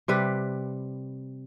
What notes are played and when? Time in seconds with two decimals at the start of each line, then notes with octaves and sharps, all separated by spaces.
0.08 C3 G3 B4